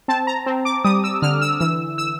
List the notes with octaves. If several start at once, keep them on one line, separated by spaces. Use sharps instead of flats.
C4 A5
A#5
C4
D6
G3 D#6
E6
D3 F6
E6
E3 E6
E6